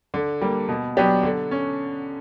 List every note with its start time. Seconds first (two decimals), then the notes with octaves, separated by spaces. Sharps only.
0.14 D3
0.41 G3 A#3
0.69 B2
0.97 F#3 B3 D4 G4
1.23 D3
1.51 C#4